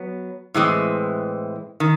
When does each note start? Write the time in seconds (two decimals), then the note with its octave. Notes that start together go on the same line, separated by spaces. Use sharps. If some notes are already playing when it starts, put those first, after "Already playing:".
Already playing: F#3 B3
0.54 A2 E3 G#3 C4
1.80 D#3